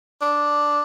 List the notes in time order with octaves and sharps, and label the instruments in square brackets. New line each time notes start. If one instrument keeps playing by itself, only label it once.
[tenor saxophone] D4